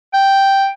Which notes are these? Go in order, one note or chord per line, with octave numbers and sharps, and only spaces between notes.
G5